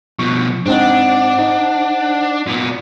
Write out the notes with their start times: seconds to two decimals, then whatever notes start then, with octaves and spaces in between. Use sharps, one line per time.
0.19 B2 F3 C#6
0.66 G#2 C4 D4 D#4 C5 F#5
1.39 D#4
2.46 A#2 B3